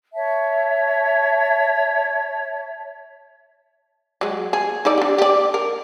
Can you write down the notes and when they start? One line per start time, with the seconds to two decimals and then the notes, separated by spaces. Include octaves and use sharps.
0.14 C#5 E5 A5
4.21 F#3 G#3
4.53 G#4
4.85 D#4 A4 D5
4.98 D4 G4
5.18 G4 D5
5.54 A#4